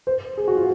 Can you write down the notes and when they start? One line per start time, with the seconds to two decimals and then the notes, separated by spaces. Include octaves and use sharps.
0.07 C5
0.37 G#4
0.48 F#4
0.57 F4